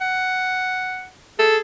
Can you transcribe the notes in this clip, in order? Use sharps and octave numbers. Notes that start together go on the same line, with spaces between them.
F#5
G#4 A4